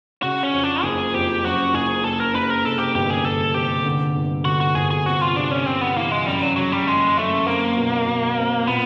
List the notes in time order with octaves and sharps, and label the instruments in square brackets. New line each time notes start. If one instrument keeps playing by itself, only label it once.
[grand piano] C#3 [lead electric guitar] F#4
[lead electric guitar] C#4
[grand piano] F2
[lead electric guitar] D4
[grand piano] F#1 [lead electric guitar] G#4
[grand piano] F2 [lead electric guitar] G4
[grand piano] F#2 [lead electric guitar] F#4
[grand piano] F#1 [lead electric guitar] G#4
[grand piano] F#1 [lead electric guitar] A4
[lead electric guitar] A#4
[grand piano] F#1 [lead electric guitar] B4
[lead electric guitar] A#4
[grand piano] C3 [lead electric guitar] A4
[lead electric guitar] G4
[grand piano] G1 [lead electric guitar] G4
[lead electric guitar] G#4
[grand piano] G1 [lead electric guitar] A4
[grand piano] C3 [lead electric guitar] G4
[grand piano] D3
G1
[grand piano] D3 [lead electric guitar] F#4
[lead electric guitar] F#4
[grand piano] G1 [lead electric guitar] G#4
[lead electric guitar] G#4
[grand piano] C3 [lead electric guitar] F#4
[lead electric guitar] F4
[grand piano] C3 [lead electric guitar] D4
[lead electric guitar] C#4
[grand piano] C3 [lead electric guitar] C4
[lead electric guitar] B3
[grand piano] E3 [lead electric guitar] A#3
[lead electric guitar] G#3
[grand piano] F#2 [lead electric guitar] G3
[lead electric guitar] F#3
[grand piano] C#3 [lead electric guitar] F#3
[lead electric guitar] G3
[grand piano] F#1 [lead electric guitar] G#3
[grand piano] F#2 [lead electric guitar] A3
[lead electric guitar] A#3 [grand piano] C4
[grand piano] B2
B2
C4
[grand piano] A#2 [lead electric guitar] B3